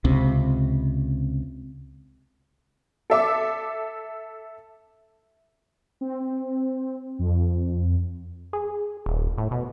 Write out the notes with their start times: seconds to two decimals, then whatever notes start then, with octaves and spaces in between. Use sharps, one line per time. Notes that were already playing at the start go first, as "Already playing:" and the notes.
0.05 C#2 C3
3.10 A4 E5 D6
6.01 C4
7.19 F2
8.53 G#4
9.06 D#1
9.38 A2
9.51 B2